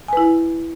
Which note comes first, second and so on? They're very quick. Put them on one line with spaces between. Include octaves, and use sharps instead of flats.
G#5 B4 E4